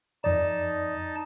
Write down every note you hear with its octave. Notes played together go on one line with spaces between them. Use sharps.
F2 D#4 D5 A5